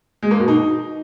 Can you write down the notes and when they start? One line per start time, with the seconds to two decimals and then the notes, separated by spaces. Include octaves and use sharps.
0.23 G#3
0.31 A#3
0.39 B2
0.48 D#4